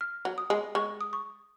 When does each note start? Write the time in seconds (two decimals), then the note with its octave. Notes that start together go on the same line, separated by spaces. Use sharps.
0.01 F6
0.25 F#3
0.38 D#6
0.50 G#3
0.75 G#3 C#6
1.01 D#6
1.13 C#6